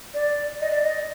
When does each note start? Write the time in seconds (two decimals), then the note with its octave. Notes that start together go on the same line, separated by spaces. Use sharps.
0.14 D5
0.61 D#5
0.71 D5
0.82 D#5